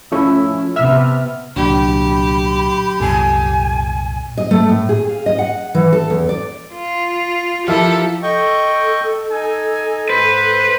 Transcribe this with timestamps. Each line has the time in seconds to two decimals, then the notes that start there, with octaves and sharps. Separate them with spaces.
0.12 F3 A3 C#4 E4
0.76 C3 B3 E5 F6
1.56 C2 A#2 D3 F#3 D4 G4 B5
3.00 C2 F#2 A#2 A4 G#5
4.38 D#5
4.51 A3
4.69 A2
4.89 G#4
5.09 F5
5.26 D#5
5.39 F#5
5.75 E3
5.93 A4
6.10 E2
6.29 D5
6.73 F4
7.68 F3 E4 F4 G4 A4 A#4
8.23 A4 D#5 G5 C#6
9.31 D#4 G#5
10.10 G#2 B4 C5